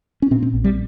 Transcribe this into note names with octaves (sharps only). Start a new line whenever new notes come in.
C#4
A#2 C4
C4
A#1
G3